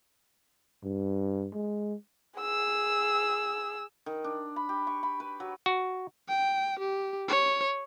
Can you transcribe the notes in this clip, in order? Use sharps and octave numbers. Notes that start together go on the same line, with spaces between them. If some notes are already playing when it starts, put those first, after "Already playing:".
G2
G#3
G#4 E6
D#3
D4
B5
G4
C#6
B5
B4
F#3
F#4
G5
G4
C#5